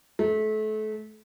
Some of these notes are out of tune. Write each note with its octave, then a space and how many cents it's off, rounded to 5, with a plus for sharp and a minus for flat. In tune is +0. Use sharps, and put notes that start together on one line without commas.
A3 -30